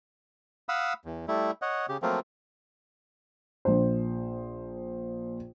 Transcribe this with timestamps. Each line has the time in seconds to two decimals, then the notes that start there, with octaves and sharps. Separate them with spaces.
0.69 F5 F#5 B5 D#6 E6
1.05 E2
1.28 G3 A3 E4
1.62 C#5 D#5 F#5
1.89 C#3 G4
2.02 F3 F#3 A3 A#3 C4 F4
3.65 A#1 C5